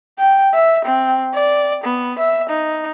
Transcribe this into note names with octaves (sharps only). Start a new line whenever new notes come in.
G5
E5
C4
D5
B3
E5
D#4